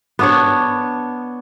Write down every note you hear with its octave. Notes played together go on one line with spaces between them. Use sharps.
B3 D4 C#5